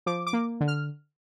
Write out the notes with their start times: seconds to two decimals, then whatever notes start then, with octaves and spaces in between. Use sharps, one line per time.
0.06 F3 D6
0.27 D6
0.33 A#3
0.61 D3
0.68 F6